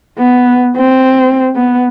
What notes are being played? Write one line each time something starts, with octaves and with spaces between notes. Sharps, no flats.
B3
C4
B3